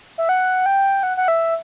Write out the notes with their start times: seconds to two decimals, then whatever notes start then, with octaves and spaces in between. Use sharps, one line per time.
0.18 E5
0.29 F#5
0.66 G5
1.03 F#5
1.17 F#5
1.28 E5